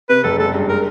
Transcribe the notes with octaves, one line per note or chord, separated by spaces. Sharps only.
C3 B4
F#1 A4
G#3 A4
G2
G#3 A#4